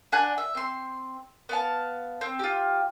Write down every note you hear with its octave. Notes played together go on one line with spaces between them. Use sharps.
D4 F#5 G#5 F#6
E5
C4 C6
B3 F5 A5
C4
F4 G4